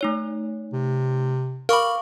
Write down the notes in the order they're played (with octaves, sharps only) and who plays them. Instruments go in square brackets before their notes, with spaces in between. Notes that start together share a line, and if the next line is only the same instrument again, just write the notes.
[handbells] A3 D#4 C#5
[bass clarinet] C3
[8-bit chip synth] A#4 B5 [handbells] F5 C#6 D6